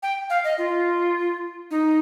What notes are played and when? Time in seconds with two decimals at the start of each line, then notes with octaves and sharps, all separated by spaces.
0.03 G5
0.30 F5
0.44 D#5
0.58 F4
1.71 D#4